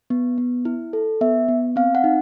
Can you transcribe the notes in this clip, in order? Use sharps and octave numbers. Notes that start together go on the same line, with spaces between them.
B3
B3
E4
A4
B3 E5
B3
C4 F5
F#5
D#4